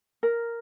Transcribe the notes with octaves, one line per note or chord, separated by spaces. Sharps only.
A#4